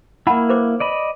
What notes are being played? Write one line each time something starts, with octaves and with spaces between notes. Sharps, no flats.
A#3 E4 F#5 A5 B5
B4 C5 D6
D5 D#5 B5